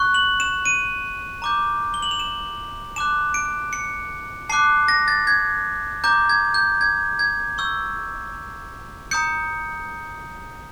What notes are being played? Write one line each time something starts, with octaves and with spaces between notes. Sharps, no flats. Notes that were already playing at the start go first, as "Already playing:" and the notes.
Already playing: C#6 F#6
F#7
E7
D#7
A#5 D6 G6
G7
F#7
F7
E7
A5 D6 F#6 E7
D7
C#7
A5 D6 F#6 C7
A#6
A6
G#6
A#5 D6 G6
G#6
G6
G#6
G#6
C#6 E6 G6
A#5 D#6 G6 C#7